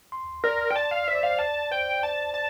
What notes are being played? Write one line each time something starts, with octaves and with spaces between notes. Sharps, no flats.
C6
A#4 D5
G5
D5 A5
F5
C5 E5
D5
C5 F5
D5 A5
C5 G5
D5 A5
D5 A5